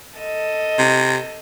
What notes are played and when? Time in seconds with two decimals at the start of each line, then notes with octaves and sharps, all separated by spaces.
0.18 A4 D#5
0.79 C3